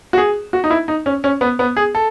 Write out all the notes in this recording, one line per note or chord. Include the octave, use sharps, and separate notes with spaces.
F#4
G#4
F#4
D#4
E4
D#4
C#4
C#4
B3
B3
G#4
A4